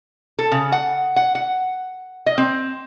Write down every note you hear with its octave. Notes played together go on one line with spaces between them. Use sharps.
A4
C#3
F#5
F#5
F#5
D#5
C4